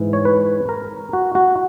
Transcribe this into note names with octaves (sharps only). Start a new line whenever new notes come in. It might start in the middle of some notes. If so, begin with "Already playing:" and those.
Already playing: G#2 E3
C#5
B4
A#4
F#4
F#4